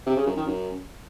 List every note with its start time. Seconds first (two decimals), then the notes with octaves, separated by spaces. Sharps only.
0.06 C3
0.16 C#3
0.26 F#2
0.36 D#3
0.46 F#2